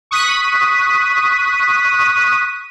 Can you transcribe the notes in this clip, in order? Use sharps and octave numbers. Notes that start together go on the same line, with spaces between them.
C#6 D#6 F#6 B6 D#7